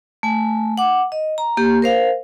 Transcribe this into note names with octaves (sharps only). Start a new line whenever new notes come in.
A3 G#5
F#5 D6
D#5
A#5
A#3 G4
A#4 C5 F5